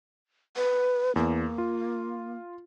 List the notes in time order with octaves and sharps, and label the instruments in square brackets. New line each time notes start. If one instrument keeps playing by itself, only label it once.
[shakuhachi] B4
[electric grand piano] E2 [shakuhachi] A#3
[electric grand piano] F4